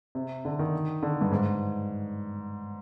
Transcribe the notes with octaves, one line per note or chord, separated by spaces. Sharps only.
C3
D3
D#3
D3
G2
G#2